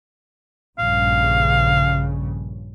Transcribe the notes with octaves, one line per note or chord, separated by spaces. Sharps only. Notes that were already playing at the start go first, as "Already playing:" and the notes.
A#1 G2 C#3 F5